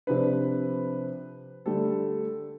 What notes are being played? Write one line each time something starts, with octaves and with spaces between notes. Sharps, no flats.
C3 F3 D4 B4
D3 G3 A3 G4 A4